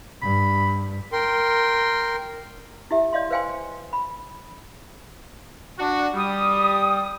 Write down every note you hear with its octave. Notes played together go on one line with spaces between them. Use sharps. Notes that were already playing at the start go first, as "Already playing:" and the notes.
G2 B5
A#4 G5 C6
E4 G4 E5
D5 D#5 F5 C6
B4 C5 F5 G5 G#5 C6
B5
D4 F#4
G3 D#6